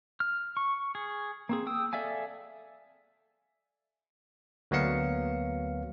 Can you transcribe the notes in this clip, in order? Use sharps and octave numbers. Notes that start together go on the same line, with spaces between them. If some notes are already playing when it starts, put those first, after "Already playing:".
F6
C#6
G#4
A#3 C4 G#4
G5 D#6 E6
A4 D5 E5 F5 G#5
D2 F#3 A#3 B3 F5 C#7